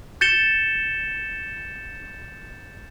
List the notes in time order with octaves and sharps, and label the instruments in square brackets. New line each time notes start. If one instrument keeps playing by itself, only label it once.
[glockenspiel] G6 A6 C#7 E7 G7